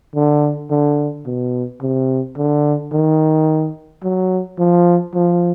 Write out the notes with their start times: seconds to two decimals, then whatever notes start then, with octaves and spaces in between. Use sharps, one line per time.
0.15 D3
0.71 D3
1.26 B2
1.82 C3
2.37 D3
2.92 D#3
4.03 F#3
4.59 F3
5.14 F3